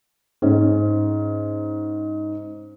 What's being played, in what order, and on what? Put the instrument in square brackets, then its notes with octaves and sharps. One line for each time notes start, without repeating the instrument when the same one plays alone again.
[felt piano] G#2 C#4